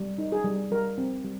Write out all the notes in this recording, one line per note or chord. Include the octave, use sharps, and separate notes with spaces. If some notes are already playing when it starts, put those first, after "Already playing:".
Already playing: G3
D#4
G#4
G3
G3 A#4
C4
G3